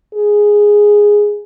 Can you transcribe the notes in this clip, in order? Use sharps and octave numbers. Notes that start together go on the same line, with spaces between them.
G#4